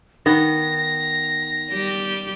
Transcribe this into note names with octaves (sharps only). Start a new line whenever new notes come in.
D#3 B3 A#6
G3 G4